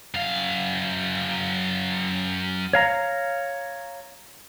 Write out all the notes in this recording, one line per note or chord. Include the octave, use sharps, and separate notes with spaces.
F#2 F5
C#5 F5 A#5